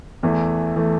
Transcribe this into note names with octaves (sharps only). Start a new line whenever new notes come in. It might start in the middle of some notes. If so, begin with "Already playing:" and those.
E2 E3 A3
E3 A3